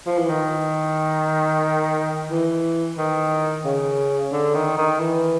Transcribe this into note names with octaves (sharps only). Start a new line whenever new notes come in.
F3
E3
D#3
E3
D#3
C#3
D3
D#3
D#3
E3